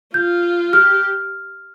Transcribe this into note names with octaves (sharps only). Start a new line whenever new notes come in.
F4 G6
G4 F6